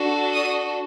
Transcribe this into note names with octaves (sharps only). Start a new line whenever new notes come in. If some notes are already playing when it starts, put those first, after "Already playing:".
Already playing: D4 F#4 A4
D#6